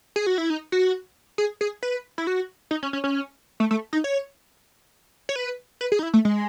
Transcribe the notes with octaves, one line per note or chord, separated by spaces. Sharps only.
G#4
F#4
E4
D#4
F#4
G#4
G#4
B4
E4
F#4
D#4
C#4
C#4
C#4
A3
A3
D#4
C#5
C#5
B4
B4
G#4
D#4
E4
A3
G#3